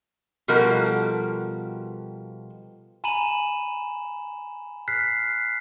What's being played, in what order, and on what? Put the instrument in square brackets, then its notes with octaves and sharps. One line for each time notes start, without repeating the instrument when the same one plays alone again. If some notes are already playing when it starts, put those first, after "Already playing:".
[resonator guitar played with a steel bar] B2 F3 G3 F#4 A4 A#4
[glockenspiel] G#5 A#5 B5 D#7 E7 F#7
F6 F#6 B6 C7